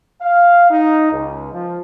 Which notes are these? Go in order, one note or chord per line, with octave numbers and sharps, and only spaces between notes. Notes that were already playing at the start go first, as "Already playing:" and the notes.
F5
D#4
C#2
F3